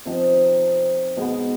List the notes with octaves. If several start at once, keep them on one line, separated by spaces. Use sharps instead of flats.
C3 F3 C4 D#4
B2 G#3 B3